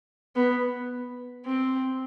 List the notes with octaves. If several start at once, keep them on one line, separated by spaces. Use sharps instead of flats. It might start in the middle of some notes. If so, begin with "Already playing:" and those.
B3
C4